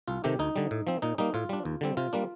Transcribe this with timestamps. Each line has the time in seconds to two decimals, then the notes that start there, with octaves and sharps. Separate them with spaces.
0.08 C2 F4
0.24 C3 D#3 A3 G4
0.39 D2 D#4
0.56 D3 G3
0.71 A2
0.87 F3 C4
1.02 A#2 D#4
1.18 G3 A#3 D#4
1.34 A2 F4
1.49 G3 D4
1.65 D#2
1.81 D3 G3 C4
1.97 C3 F4
2.13 G3 A#3 D4